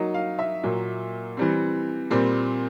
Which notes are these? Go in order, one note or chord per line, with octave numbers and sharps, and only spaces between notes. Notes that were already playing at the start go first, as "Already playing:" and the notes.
Already playing: F#3 A#3 D#4
F5
E5
A#2 F#3 A#3
E3 G3 C4
A#2 G3 C4